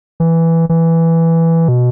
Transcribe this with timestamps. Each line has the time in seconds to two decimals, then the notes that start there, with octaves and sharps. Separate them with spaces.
0.20 E3
0.69 E3
1.68 B2